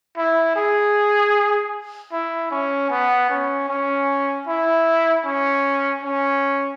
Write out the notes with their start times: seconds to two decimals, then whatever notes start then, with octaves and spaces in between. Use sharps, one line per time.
0.17 E4
0.56 G#4
2.12 E4
2.51 C#4
2.90 B3
3.30 C#4
3.69 C#4
4.47 E4
5.25 C#4
6.04 C#4